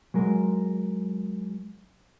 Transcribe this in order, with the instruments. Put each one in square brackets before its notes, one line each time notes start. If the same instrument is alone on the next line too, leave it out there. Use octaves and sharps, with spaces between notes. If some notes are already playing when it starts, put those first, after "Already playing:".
[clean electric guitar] F#3 G#3 A#4